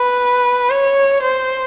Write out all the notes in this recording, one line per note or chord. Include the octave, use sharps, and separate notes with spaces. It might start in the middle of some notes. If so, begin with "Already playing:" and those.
Already playing: B4
C#5
C5